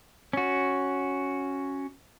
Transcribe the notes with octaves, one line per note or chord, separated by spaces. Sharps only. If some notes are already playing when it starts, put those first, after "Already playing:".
C#4 F#4